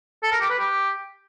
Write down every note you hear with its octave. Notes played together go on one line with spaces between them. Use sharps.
A4
A#4
G4
B4
G4